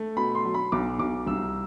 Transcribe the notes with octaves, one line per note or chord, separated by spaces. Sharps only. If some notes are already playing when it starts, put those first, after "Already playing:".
Already playing: A3
B2 B5
C6
F#3
B5
B1 D6
B1 D6
C2 E6